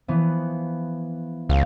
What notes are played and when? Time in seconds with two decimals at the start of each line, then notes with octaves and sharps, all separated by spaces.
0.08 E3 F3 B3
1.49 C#2 F5 F6